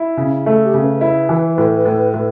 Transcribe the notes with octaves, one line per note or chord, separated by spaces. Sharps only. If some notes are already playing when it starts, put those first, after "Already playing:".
Already playing: E4
C#3
A3 A4
G4
C#3
B4
E4 B4
E3
A2
A2
A2